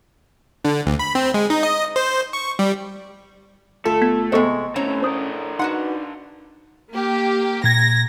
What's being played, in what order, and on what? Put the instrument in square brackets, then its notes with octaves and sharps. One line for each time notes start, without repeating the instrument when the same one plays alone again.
[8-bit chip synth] D3
D2
B5
C4
G#3
D#4
D#5
C5
C#6
G3
[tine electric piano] G1 F4 A5 [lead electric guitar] A3 [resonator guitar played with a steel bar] A4
[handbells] B3 G#6 B6
[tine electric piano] A1 D#5 C#6 [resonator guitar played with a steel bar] C3 G#3 [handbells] B3 A4 C5
[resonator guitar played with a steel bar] A2 C#5 A#5 [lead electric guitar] A3 C4 [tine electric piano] C#4
[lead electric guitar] D4 A#4 [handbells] C5 D#6 G6
[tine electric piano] D#4 [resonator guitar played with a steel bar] F#4 B4 F#5 [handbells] C6
[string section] A#3 G4
[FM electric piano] A#2 G#6 [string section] A#6